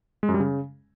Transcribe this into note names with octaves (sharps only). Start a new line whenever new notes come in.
G#3
F#2
G3
C#3